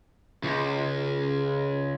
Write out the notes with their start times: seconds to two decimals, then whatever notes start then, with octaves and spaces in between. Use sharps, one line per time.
0.43 C#2